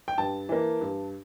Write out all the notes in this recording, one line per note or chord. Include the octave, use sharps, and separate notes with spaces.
G5
G2 A5
E3 A#3
G2